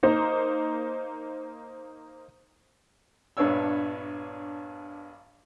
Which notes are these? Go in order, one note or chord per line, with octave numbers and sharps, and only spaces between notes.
A#3 D#4 C5
A#1 G2 B3 D4 C#5 E6